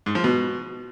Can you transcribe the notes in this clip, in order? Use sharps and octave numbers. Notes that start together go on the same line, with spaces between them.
G#2
F3
B2